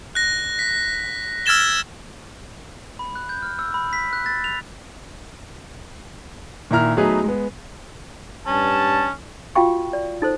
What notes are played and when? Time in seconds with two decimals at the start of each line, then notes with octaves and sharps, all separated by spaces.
0.15 F#6 A#6
0.59 B6
1.46 E6 F6 G#6 A6 E7 G7
2.99 B5
3.16 F#6
3.29 G6
3.42 F6
3.59 E6
3.74 B5
3.93 B6
4.13 F#6
4.26 A6
4.44 F7
6.71 A#2 D#3 E4 A#5 F6
6.97 F#3 A3 B3 D#4 G#4 B4
7.24 G#3 B3
8.47 G2 C#4 A5
9.55 F4 F#4 F5 G5 C#6
9.93 D5
10.22 D#4 A4 C5